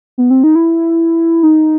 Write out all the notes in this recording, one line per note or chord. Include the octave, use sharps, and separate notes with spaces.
B3
C4
D#4
E4
D#4